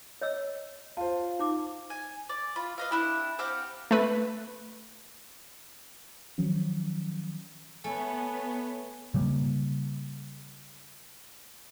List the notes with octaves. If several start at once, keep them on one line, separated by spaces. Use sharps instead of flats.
C#5 D#5 E6
F4 C5 A5
D#4 D6
G#5
D5
F4 B5
B4 D#5 F5
D4 E4 G4
C4 G4 F5 F#5
A3 B4
D#3 F3 F#3 C#4
A3 B3 B4 C#5 G#5
C#3 G3 A#3